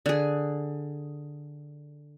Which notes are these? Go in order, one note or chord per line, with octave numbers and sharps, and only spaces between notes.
D3 G#4